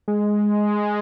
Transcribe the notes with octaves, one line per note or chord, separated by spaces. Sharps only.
G#3